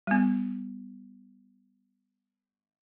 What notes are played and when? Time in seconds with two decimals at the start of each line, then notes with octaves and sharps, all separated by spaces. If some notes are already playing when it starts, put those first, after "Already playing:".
0.07 G3 B3